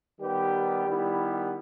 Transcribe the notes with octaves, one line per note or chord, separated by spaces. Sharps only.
D#3 G3 B3 G4 B4
D#3 G3 B3 E4 G4